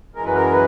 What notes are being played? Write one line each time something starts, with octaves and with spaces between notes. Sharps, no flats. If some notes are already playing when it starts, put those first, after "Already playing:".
F#2 E3 G#3 A#4
B4
A#4
B4